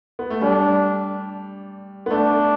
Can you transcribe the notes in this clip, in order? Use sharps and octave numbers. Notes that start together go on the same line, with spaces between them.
B3
A3
G3 D4
B3
A3 D4